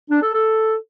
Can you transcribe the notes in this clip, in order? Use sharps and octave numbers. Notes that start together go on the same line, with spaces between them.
D4
A4
A4